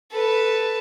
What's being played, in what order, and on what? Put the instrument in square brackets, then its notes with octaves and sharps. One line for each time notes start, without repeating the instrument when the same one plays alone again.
[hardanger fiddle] A4 B4